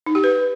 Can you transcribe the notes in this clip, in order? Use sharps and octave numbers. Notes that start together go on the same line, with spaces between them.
D#4
G4
B4